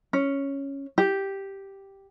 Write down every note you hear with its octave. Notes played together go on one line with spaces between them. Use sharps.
C#4
G4